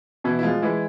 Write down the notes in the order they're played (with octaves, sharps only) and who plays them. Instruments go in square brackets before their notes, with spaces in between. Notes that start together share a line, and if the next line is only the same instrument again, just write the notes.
[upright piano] B2 [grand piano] E3 E4
[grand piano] E4
[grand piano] F3 F4 [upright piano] G#3
[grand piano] E3 E4 [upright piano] G#3